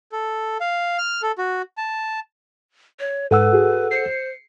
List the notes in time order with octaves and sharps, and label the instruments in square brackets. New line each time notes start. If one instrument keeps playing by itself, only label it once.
[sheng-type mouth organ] A4
F5
F6
A4
F#4
A5
[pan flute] C#5
[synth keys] G#2 [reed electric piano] A4 F#5 E6 [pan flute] B4
[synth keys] F#4 G#4
[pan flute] C5 [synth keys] C7 C#7